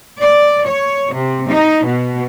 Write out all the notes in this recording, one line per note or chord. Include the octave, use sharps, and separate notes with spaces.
D5
C#5
C3
D#4
B2